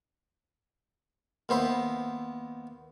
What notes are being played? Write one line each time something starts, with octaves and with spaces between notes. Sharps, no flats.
D#2 B3 C5 E5